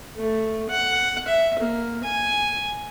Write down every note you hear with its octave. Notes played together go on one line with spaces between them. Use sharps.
A3
F#5
E5
A#3
G#5